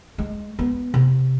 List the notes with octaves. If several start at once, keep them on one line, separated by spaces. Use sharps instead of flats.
G#3
B3
C3